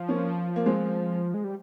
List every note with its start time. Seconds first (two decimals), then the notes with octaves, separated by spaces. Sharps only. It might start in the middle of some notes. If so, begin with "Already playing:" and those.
Already playing: F3
0.09 A#3 C#4
0.56 A#3
0.66 G#3 C4
1.34 G#3
1.44 G3